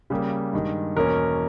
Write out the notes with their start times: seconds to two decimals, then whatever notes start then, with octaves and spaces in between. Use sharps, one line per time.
0.10 C#3 G3 A#3
0.53 G2 D#3 G#3
0.97 E2 B2 A#3 C#4 A#4